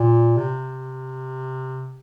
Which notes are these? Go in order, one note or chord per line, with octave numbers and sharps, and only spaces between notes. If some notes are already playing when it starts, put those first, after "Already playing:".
Already playing: A#2
C3